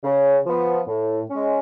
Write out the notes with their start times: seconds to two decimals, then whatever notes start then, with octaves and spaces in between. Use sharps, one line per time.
0.03 C#3
0.46 F3 B3
0.88 A2
1.30 G#3 C#4